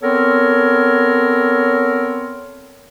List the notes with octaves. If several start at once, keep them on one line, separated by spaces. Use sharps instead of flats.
B3 C4 A4 A#4 C#5